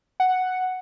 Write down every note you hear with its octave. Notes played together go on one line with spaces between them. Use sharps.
F#5